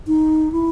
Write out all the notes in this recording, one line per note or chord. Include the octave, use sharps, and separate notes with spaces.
D#4
E4